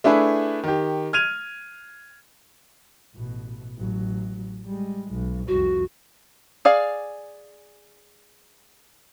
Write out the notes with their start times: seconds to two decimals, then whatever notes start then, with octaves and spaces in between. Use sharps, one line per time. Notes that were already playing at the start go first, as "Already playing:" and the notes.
0.04 A3 D4 E4 G#4 B4
0.64 D#3 G4
1.13 F6 G#6 D#7 F7
3.15 A1 B2
3.79 A1 F#3
4.66 G3 G#3
5.12 B1
5.48 C2 F2 F#4
6.65 G#4 D5 F5